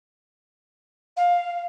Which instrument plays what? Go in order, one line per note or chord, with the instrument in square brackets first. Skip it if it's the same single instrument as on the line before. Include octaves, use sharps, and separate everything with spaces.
[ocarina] F5